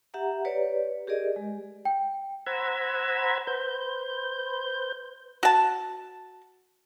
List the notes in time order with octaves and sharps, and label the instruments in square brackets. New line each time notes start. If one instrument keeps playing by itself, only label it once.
[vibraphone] G4 E5 F#5 A#5
G4 B4 C#5 D5
G4 G#4 A#4 D5 D#5
G#3
[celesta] G5
[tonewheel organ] C5 F#5 A#5 B5 E6 G#6
B4 C5 G6
[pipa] F#4 A5